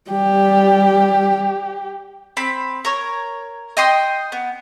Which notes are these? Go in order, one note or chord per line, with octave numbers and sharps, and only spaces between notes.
G3 G4
C4 B5
A#4 C#5
D#5 G5 C6 D#6
B3